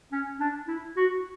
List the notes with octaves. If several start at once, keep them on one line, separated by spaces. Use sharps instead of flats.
C#4
D4
E4
F#4